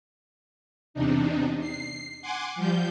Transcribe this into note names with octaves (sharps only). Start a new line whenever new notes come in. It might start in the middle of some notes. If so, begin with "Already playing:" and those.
E2 C3 D4 D#4
C7
F#5 G#5 C6 D6
F3 G3 G6